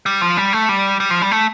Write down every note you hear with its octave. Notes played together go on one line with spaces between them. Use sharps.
G3
F3
G3
A3
G3
G3
F3
G3
A3